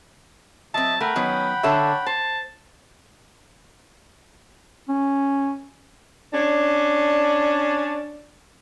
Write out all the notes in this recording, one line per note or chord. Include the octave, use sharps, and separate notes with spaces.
F#3 C4 D#5 E5 A5
A3 A#4 F#5 G5 B5
D#3 F#3 B3 C#4
D3 A4 C#5 E5
C5 A5
C#4
C#4 D4